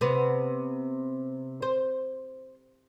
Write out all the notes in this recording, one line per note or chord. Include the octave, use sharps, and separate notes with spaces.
C3 B3
C5